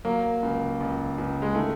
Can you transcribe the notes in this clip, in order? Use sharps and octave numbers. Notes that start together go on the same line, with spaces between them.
F#3 A#3
C#2
C#2
C#2
G#3
D#3 A3